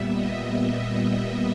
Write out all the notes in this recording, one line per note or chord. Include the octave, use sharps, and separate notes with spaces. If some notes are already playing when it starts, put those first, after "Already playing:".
Already playing: A#2 G3 B3 E5
D#5
E5